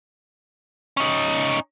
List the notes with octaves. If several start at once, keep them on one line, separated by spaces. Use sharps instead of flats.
C#4 D#4